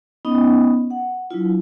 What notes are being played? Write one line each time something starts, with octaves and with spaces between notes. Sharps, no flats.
B3 C#4 D#4 D#5
F#5
F#3 D4 E4 F4